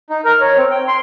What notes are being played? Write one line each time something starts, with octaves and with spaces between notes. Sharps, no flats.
D#4
A#4
C#5
C4
G5
C6